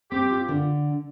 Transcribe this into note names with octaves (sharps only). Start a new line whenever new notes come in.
C4 G4
F4
D3